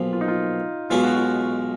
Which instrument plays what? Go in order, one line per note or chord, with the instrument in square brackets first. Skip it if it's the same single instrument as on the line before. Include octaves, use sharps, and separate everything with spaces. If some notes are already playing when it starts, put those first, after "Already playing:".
Already playing: [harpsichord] B1 A#2 F3 [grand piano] F4
[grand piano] F4
D#4
F4
[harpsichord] B1 B2 G#3 C#4 [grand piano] F4
[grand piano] F#4
F4